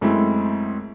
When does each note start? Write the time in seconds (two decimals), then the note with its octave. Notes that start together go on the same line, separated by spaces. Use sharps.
0.01 F#2 G#3 A3 C4 E4